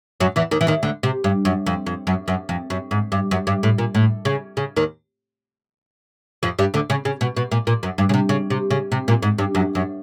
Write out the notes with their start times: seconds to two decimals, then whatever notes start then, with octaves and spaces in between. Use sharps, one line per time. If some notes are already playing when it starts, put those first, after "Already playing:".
0.20 F#2 F#3
0.36 E2 E3
0.51 D#2 D#3
0.61 E3
0.67 D#2 D#3
0.83 D2 D3
1.03 C3
1.24 G2
1.45 F#2
1.66 F2
1.87 F2
2.07 F#2
2.28 F#2
2.49 F2
2.70 F#2
2.91 G#2
3.12 G2
3.31 F#2
3.47 G2
3.63 A2
3.78 A#2
3.95 A2
4.25 C#3
4.57 C#3
4.76 D#2 D#3
6.43 F2 F3
6.59 G2 G3
6.74 D2 D3
6.90 C#3
7.05 C#3
7.21 B2
7.37 B2
7.51 A#2
7.67 A#2
7.83 F#2
7.98 G2
8.09 C#3
8.14 C3
8.29 C#3
8.50 C3
8.71 C#3
8.92 C3
9.08 A#2
9.22 G#2
9.38 G2
9.55 F#2
9.75 F#2